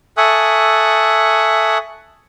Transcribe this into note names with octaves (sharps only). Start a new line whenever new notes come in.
A4 E5 G#5 C#6 D#6 F#6